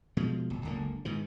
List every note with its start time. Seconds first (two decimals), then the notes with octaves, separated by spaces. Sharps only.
0.17 B2 F3 G#3
0.50 D1 G1
0.65 F#1 C#2 D3 A#3
1.05 G#2 D#3 E3